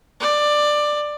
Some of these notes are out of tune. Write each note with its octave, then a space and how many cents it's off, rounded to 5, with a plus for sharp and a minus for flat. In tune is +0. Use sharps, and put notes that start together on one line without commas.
D5 +15